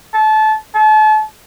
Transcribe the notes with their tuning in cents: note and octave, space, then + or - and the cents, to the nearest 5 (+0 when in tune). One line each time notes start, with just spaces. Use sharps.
A5 -25
A5 -35